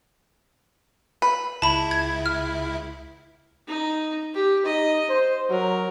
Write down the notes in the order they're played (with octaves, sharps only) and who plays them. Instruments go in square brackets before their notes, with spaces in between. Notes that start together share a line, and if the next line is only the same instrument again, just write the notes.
[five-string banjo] B4
[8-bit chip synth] C#2 E4 [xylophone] A5 B5
[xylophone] G#6
F6
[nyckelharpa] D#4
G4
[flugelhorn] D#4 [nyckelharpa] D#5
[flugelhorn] C5
[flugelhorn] F#3 [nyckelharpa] A#4